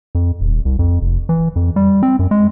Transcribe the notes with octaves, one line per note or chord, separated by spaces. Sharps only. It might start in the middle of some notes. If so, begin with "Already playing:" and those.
F2
D#1
C2
F2
F1
E3
F2
G3
C4
F#2
G#3